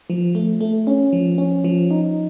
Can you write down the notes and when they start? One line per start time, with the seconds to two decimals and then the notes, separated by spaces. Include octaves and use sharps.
0.10 F3
0.35 A3
0.61 A3
0.87 C#4
1.13 F3
1.38 C#4
1.64 F3
1.91 D#4